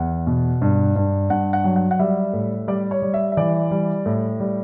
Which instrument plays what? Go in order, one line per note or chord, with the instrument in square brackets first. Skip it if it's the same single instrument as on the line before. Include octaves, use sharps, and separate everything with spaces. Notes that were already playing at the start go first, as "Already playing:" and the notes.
Already playing: [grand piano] E2 F#5
B2
G2
G2
G2 F#5
F#5
F#3
F#5
F#5
G3 E5
A2
G3 D5
C#5
G3
E5
E5
E3 D5
G3
A2
G3